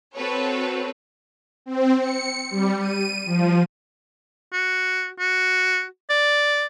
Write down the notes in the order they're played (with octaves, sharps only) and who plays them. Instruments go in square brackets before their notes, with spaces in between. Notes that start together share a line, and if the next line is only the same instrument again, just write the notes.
[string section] C4 F#4 A4 B4 C#5
[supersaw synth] C4
C#7
G3
D#7
F3
[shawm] F#4
F#4
D5